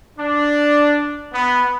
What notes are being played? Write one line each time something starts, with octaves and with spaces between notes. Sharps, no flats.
D4
B3